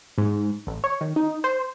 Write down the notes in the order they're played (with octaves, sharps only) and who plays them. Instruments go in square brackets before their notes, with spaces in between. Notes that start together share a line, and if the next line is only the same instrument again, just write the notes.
[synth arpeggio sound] G#2
A1
C#5
D#3
D#4
C5